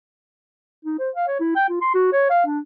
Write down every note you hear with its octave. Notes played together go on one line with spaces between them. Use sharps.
D#4
C5
F5
C#5
E4
G5
F4
C6
F#4
C#5
F5
D4